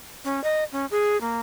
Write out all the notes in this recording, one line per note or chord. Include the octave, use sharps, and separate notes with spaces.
C#4
D#5
C#4
G#4
A#3